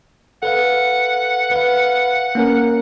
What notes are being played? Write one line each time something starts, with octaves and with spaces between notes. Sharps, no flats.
A4 B4 F5 F#5
B4 F5
A#3 C#4 A#4